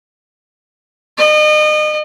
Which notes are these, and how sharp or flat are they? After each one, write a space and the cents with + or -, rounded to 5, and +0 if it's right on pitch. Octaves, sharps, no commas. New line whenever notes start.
D#5 -35